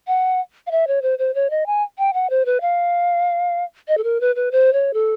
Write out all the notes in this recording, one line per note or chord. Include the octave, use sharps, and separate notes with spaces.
F#5
F5
E5
C#5
C5
C5
C#5
D#5
G#5
G5
F#5
C5
B4
F5
D#5
A4
A#4
B4
B4
C5
C#5
A4